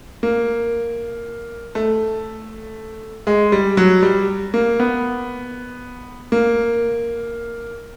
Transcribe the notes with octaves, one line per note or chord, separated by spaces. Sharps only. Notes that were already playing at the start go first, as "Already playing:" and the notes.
A#3
A3
G#3
G3
F#3
G3
A#3
B3
A#3